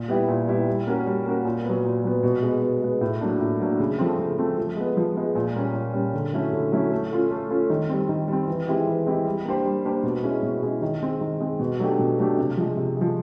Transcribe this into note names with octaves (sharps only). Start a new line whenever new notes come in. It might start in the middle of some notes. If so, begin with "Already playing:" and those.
Already playing: A#2
G3 B3 E4 G4
A#2
G3 B3 E4 G4
G3
A#3 C#4 F#4 A#4
G3
A#3 C#4 F#4 A#4
A#2
F#3 B3
A#2
F#3 B3
B2
G#3 B3
B2
G#3 B3
A2
F#3 A#3 D4
A2
F#3 A#3 D4
C#3
F3 A3 C4
C#3
F3 A3 C4
F3
G#3 B3
F3
G#3 B3
A#2
G3 A#3 C#4
A#2
G3 A#3 C#4
D3
F#3 A3 C#4 E4
D3
F#3 A3 C#4 E4
A3
C#4 F4 A4
A3
C#4 F4 A4
D#3
G3 C4
D#3
G3 C4
E3
G#3 C4 E4 G4
E3
G#3 C4 E4 G4
G3
A#3 D4 G4 C5
G3
A#3 D4 G4 C5
B2
G#3 C#4 E4
B2
G#3 C#4 E4
D#3
G#3 C4
D#3
G#3 C4
B2
F#3 A3 D4 G4
B2
F#3 A3 D4 G4
C3
F3 G#3
C3
F3 G#3